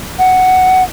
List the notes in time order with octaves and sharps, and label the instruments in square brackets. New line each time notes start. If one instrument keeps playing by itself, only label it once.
[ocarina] F#5